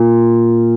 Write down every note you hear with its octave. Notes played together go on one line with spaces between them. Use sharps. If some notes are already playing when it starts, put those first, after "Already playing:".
Already playing: A#2